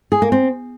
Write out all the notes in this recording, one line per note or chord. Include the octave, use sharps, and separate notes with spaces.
G#4
A#3
C4